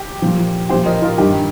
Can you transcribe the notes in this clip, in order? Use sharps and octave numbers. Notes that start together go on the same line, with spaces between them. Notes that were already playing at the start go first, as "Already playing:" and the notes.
Already playing: G4
A#2 F3
A#2 F3 G4 C5
A#4 D#5
F4 A#4
G2 D#3 G4